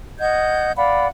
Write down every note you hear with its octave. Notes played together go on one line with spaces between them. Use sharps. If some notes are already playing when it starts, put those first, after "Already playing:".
D#5 F#5 G6 G#6
D5 F5 F#5 B5